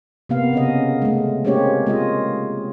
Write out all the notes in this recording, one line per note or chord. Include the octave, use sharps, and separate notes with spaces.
C3 A#3 B3 F5
C#3 C#4 D#5
G#3 A3
G#3 A#3 C4 C#4 G4 C#5
G#3 F4 D#5